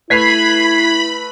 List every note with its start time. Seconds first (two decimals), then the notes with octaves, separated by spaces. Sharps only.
0.10 A3 E4 B4 B5 G#6 B6 C7 F7